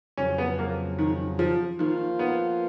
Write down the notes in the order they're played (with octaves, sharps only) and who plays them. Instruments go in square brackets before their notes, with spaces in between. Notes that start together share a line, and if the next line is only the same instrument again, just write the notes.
[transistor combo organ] F2 C#3 F#3 [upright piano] C#4
[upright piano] B3
A#3
D#3
F3
[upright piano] D#3 [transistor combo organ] F3 A#3 F4
[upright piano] B3